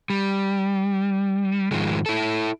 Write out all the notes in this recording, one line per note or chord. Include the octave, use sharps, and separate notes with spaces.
G3
G#2 D#3 F3 G#3
E4 A4